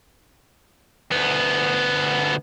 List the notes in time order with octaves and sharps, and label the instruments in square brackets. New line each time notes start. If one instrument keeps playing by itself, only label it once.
[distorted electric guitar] D2 B3